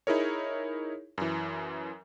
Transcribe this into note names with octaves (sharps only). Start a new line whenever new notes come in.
D#4 E4 G#4 A#4 C#5
F#2 E3